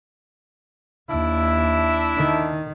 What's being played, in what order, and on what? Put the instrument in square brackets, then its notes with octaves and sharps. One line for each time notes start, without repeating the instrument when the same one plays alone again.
[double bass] D#2 [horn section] D4 E4 E5
[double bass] D#3